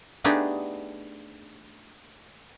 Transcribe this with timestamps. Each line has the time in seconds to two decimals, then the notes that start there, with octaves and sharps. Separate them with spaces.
0.24 A3 B3 D4 D#4 G4 G#4